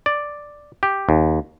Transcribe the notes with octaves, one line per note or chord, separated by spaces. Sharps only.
D5
G4
D#2